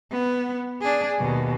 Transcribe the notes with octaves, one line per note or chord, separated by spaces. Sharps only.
B3
D4 G#4
D#2 B2